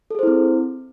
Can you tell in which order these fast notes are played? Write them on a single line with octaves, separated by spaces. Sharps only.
A4 G#4 C5 E4 C4